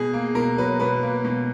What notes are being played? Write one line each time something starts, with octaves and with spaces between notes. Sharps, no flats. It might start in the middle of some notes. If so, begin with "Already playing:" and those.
Already playing: B2 G#4
A#3
B2 A#4
F#3 B4
B2 B4
A#3
B2